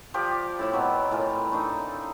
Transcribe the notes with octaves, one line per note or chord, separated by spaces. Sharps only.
F3 G4 D5
A2 E4 B5
B2 F#3 C4
A2 E3 F4 A#4
A3 D4 D#4